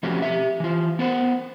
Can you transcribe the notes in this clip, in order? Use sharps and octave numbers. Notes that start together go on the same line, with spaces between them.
F3 A3 C4 C#4 F#4 G4
G4 E5
E3 F4
B3 C5 F#5